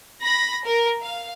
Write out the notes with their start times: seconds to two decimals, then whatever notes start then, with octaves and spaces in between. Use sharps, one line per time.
0.21 B5 A#6
0.65 A#4
1.01 F5